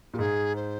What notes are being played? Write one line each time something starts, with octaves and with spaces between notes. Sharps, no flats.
A#2 G4
G#2 G#4
C5